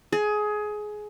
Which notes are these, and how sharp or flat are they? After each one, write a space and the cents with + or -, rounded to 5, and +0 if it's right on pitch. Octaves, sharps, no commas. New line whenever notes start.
G#4 +20